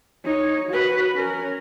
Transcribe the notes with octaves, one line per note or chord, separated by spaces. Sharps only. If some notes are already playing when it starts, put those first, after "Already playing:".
D#4 C#5
F#4 B4
C#4 A#4